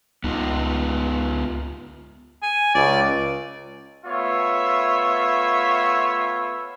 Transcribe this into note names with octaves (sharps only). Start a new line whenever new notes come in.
C#2 B3 D#4 F4
G#5
C#2 D5
A3 B3 F4 C#5 E5